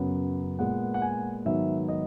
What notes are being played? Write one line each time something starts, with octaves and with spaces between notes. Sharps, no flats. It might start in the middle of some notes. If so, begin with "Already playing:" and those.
Already playing: F#2 C#3 F#3 B3
A#2 G#3 B3 F#5
F#5
G#5
G#2 D#3 F#3 B3 E5
D#5